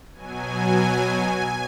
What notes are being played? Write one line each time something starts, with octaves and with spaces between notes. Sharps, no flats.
B2 F#3 G#5